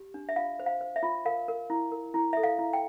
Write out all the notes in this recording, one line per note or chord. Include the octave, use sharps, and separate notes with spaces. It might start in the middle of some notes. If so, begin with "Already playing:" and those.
Already playing: G4
D4
E5
F4 F5
C5
F5
C5
E5
F4
A#4 F5
A#4
E4
A#4
E4
A4 E5
F5
E4
G5